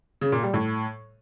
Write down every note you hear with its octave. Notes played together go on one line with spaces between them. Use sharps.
C#3
A#2
G3
A2